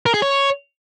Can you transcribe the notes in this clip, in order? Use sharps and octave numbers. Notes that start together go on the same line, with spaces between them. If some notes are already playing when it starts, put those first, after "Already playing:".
A#4
G#4
C#5